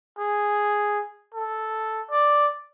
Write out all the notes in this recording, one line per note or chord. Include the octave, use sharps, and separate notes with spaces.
G#4
A4
D5